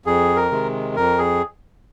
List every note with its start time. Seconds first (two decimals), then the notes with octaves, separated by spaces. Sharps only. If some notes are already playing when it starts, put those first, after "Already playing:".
0.06 F2 G#4
0.36 A#4
0.51 C3 D#3 G#3
0.96 F2 A#4
1.19 G#4